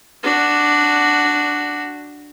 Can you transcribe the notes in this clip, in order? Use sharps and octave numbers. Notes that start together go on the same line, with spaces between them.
D4 F#4